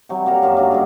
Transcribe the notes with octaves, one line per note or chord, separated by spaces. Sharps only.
C3 F#3 G3
A#3 A4 A#4 A#5
F#2 A#3 F#4 E5
D3 F#3 D4
G2 G#4